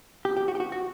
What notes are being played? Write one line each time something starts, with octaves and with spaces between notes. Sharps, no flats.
G4
G4
F#4
G4
F#4
F#4